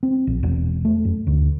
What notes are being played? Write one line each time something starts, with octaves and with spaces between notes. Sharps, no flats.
C4
A#1
E1
A3
F#2
D2